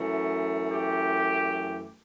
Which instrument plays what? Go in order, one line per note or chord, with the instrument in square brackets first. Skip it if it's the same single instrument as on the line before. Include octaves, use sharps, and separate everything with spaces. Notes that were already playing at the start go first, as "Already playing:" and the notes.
Already playing: [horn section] F#2 E3 A3
G4